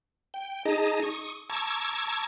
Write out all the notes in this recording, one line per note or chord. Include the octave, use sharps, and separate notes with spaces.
G5
D#4 G#4 D#5 A5 A#5
C#6 D#6
A5 A#5 C#6 D6 E6 G#6